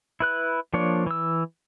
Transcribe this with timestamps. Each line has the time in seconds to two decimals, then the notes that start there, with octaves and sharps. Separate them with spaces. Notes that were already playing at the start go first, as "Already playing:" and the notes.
0.20 E4 B4 F#6
0.74 F3 A#3 D4 C#5 D5
1.06 E3 E6